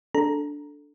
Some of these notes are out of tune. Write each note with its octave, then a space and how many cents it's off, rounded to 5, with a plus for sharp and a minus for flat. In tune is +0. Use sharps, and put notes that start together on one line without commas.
D4 -5 A4 +0 A#5 +0